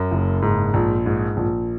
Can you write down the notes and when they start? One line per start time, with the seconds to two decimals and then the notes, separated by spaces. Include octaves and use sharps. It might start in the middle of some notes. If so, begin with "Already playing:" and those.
Already playing: F#2
0.12 F#1
0.42 G#2
0.74 A#1
1.06 G#2
1.37 A#1